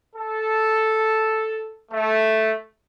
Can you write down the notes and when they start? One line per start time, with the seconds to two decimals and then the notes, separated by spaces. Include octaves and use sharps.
0.15 A4
1.91 A3